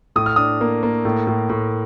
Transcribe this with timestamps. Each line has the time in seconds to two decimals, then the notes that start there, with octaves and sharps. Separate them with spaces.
0.16 A2 D#6
0.26 F6
0.36 D4 D#6
0.61 A#3
0.83 A#3
1.05 A2
1.27 A2
1.49 A2